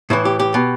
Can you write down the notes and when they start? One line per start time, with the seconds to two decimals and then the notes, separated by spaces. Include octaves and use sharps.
0.10 A2 E3 E4
0.25 G4
0.40 G4
0.54 B2